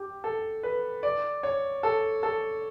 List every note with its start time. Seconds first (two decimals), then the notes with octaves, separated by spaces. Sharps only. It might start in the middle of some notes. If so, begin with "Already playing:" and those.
Already playing: G4
0.24 A4
0.63 B4
1.03 D5
1.43 C#5
1.83 A4
2.23 A4